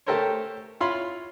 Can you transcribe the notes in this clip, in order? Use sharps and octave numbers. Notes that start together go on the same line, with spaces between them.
A3 G4 A4 A#4 C5 C#5
E4 F4 C#5 F5 B5 C6